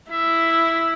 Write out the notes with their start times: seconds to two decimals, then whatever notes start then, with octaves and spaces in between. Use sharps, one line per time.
0.11 E4 E5